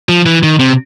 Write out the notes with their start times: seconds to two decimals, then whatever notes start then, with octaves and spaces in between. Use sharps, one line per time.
0.09 F3
0.26 E3
0.43 D#3
0.59 C3